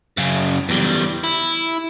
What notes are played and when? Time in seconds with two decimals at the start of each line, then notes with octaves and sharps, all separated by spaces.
0.17 F#2 C#3
0.69 E2 G3
1.24 E4